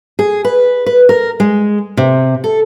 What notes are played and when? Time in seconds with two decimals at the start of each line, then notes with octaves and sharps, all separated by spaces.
0.19 G#4
0.45 B4
0.86 B4
1.09 A#4
1.40 G#3
1.97 C3
2.44 A4